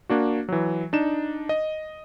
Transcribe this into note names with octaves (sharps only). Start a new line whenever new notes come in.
A#3 D4 F#4
E3 F#3
D4 D#4 E7
D#5